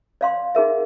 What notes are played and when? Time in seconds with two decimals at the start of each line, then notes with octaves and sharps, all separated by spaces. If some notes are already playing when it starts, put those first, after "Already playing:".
0.21 D5 F5 C6
0.55 D#4 G#4 A#4 E5